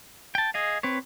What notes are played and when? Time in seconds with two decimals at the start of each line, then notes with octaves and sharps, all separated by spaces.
0.35 G5 A5
0.54 G#4 D#5 F5
0.83 C4 B4 C#5